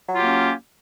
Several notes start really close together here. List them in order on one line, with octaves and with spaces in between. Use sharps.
F#3 F4 G4 A#3 C#4